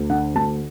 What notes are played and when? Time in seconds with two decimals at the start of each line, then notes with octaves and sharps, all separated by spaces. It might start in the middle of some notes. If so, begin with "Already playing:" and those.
Already playing: D2
0.10 D3 F#5
0.35 D2 A5